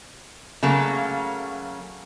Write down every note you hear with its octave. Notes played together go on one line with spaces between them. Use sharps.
C#3 F#3 A3 A#3